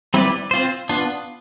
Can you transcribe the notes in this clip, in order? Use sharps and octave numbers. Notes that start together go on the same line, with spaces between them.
G3 C4 E4 B4 D5
C4 F4 C5
B3 D4 F4